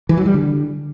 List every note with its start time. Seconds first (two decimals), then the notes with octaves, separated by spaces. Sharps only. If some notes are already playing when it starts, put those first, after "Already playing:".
0.09 E3
0.17 F#3
0.26 G3
0.34 D3